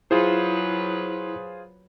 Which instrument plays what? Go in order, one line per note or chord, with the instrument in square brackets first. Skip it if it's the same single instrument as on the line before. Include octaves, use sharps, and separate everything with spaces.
[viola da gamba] F#3 B4 [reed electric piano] E4 [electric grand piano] F4 G#4 C5